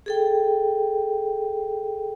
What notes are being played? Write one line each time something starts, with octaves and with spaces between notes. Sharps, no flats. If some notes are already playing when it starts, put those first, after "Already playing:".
G#4 A4 G5